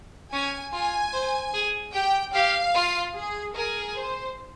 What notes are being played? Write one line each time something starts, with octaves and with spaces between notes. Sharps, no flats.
C#4 G#5
F4 G#5
C5
G#4
G4 G5
G4 F5
F4
G#4
G#4 A#4
C5